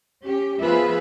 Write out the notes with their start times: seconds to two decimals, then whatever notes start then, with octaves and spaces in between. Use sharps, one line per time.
0.24 C#4 G4
0.61 F3 B3 F4 G#4 B4 E5